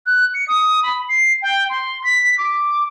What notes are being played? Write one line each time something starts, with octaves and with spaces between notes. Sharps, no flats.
F#6
C#7
D#6
B5
C7
G5
C6
B6
D6